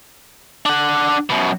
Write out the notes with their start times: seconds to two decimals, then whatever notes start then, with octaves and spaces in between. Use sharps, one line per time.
0.66 D4 F#5
1.30 F#2 B2